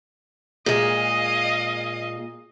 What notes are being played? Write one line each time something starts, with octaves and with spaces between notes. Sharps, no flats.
A#2 G#3 G#4 D#5 F5